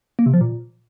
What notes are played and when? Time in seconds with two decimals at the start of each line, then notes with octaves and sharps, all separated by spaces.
0.19 A#3
0.26 C3
0.34 F3
0.41 A#2